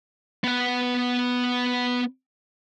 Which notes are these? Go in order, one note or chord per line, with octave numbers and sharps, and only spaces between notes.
B3 F#5